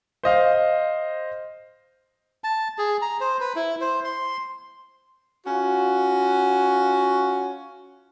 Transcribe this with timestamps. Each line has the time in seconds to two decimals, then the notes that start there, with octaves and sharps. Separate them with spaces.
0.23 C5 D#5 F5
2.44 A5
2.78 G#4
3.02 A#5
3.21 C5
3.41 B4
3.56 E4
3.81 C5
4.04 C6
5.46 C#4 F4 F#4